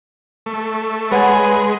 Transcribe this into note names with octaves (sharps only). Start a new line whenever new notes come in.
A3
G#3 G#4 B4 C#5 D5 F#5